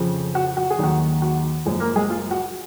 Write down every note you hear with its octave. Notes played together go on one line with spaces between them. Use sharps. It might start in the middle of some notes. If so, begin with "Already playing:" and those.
Already playing: F2 C#3 F3
F#4
F#4
G#4
D#2 D#3 F#3 F#4
F#4
F#1 F#2 F3 G#3 G#4
A#3 A#4
G#3 G#4
F4
F#4